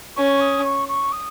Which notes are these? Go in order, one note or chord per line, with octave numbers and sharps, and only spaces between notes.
C#4 C#6
D#6
C#6
C#6
D#6